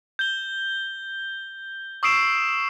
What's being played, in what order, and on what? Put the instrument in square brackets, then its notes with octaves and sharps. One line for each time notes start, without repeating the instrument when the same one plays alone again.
[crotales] G6 G7
C#6 D#6 E6 C7 D7 E7